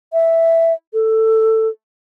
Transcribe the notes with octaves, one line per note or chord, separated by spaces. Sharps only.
E5
A4